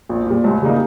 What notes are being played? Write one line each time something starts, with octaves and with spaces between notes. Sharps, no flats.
A#1
A#2 G3
C#2
C#3 G3 A#3 D#4